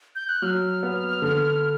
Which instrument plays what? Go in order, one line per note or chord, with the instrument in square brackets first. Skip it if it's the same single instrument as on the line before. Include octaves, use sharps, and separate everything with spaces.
[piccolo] G6
F#6
[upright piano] F#3 [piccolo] F6
[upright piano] B3
D3